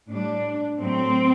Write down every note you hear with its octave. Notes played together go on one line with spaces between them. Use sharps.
A2 G3 D4
A2 F#3 A3 C4